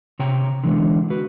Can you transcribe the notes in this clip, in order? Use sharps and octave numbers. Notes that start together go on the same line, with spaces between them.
C3 C#5 G5 A#5
D3 E3 G#3 D4
F#4 B4